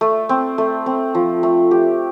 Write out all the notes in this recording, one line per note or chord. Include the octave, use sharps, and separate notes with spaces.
A3
C4
A3
C4
F3
A3
G4